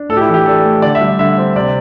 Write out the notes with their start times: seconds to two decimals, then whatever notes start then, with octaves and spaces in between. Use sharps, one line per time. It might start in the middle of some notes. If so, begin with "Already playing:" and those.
Already playing: D4
0.09 A2 A4
0.17 G4
0.21 E4
0.29 E3
0.34 G4
0.46 D4 A4
0.65 A3
0.82 D3 D5
0.95 E5
1.01 G3
1.19 D3 E5
1.38 C4
1.56 C3 D5